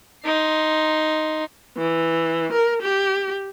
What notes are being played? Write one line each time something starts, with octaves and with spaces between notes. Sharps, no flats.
D#4 C6
E3
A#4
G4